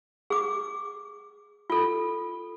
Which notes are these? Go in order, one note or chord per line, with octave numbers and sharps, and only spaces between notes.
G#4 D6
F4 A4